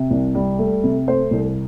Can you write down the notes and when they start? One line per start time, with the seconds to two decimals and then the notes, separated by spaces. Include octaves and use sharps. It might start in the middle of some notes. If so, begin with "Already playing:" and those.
Already playing: C3
0.11 C2
0.35 G3
0.59 A3
0.84 C3
1.08 A3 C5
1.31 C2